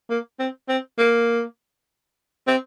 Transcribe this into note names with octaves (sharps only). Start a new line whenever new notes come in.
A#3
C4
C4
A#3
C4